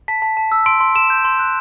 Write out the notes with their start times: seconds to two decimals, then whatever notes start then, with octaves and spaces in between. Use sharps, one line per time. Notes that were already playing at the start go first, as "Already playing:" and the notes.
0.08 A5 B6
0.22 A5
0.37 A5
0.52 E6
0.66 C6 D7
0.80 C6
0.95 C6 E7
1.10 G6
1.25 C6
1.39 F#6